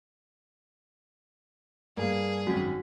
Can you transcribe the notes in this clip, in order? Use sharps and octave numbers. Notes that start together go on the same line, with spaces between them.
G2 A#3 G#4
G#1 F#2 F#4 B6